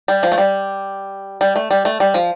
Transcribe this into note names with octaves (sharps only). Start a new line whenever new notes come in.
G3
F3
A3
G3
G3
A3
G3
A3
G3
F3